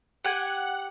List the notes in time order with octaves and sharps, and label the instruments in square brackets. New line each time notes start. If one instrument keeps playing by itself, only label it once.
[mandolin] G4 G#5 [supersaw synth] F#5 F#6